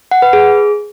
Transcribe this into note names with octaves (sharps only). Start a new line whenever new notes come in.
F#5
B4
G#4